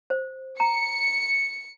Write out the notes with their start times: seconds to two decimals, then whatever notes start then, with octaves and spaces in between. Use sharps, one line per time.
0.10 C5
0.60 A#5 C#7